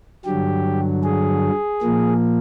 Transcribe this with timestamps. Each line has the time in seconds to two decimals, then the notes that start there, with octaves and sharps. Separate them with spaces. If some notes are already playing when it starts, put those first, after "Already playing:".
0.25 G2 D3 F#3 G4
1.04 G#4
1.82 A#2 F3 A#3